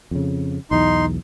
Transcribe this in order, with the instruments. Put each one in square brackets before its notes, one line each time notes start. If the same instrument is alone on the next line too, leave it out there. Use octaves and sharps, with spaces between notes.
[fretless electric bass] F2 C#3
[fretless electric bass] B1 E2 [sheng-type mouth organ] D#4 C6